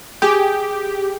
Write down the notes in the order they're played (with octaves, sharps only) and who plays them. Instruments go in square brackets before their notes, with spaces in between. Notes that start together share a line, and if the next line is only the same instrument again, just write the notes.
[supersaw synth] G4 [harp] G#4